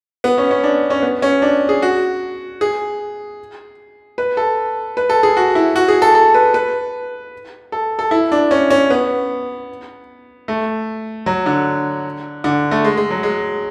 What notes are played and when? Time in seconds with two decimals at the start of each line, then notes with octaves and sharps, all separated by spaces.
0.24 B3
0.38 C#4
0.51 C#4
0.63 D4
0.90 C#4
1.02 B3
1.22 C#4
1.42 D4
1.69 G#4
1.82 F#4
2.61 G#4
4.18 B4
4.37 A4
4.97 B4
5.10 A4
5.23 G#4
5.37 F#4
5.55 E4
5.76 F#4
5.88 G#4
6.02 A4
6.15 A4
6.34 B4
6.54 B4
7.72 A4
7.99 A4
8.11 E4
8.32 D4
8.51 C#4
8.70 C#4
8.90 B3
10.48 A3
11.26 F#3
11.46 D3
12.44 D3
12.71 A3
12.84 G#3
12.97 G#3
13.10 F#3
13.23 G#3